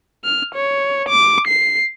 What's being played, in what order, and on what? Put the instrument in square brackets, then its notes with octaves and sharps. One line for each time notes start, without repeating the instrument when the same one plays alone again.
[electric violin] F6
C#5
D6
C7